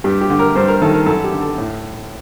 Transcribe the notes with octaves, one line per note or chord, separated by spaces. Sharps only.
G2 G4
G4
D3
A#4
G2 C5
A#4
D#3 A4
A#4
F#2 A4
G4
D3
A4
A2